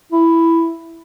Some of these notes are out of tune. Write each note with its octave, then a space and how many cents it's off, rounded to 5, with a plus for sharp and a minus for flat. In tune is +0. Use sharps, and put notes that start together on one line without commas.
E4 +5